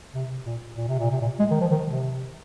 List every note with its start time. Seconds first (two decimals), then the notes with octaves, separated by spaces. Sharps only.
0.14 C3
0.46 A#2
0.77 A#2
0.88 C3
0.99 A#2
1.11 C3
1.21 A#2
1.39 G#3
1.51 D#3
1.61 F3
1.71 D#3
1.86 C3